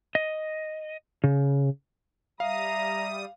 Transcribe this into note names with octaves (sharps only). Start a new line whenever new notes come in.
D#5
C#3
G3 E5 F5 A#5 D#6